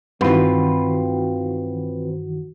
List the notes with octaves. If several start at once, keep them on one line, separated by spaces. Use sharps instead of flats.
G2 D#3 E3 C4 F4 F#4 B4